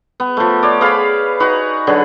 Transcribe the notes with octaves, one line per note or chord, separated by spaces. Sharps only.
B3
F3 A3
C#5 D5
B3 G#4 F5 B5
D#4 F#4 B4 A#5
D3 F#3 G#4 B4